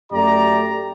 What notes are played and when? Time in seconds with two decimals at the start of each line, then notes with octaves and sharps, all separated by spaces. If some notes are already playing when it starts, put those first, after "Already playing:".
0.12 F#2 A3 G4 D5 A#5